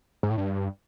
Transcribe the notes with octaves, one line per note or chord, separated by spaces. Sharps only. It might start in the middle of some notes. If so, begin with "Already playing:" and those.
G#2
A2
G2